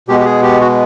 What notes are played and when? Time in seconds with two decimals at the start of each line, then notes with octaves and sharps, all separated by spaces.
0.08 B2 G#3 B3 G4
0.20 G4
0.25 G#4
0.43 G4
0.61 F#4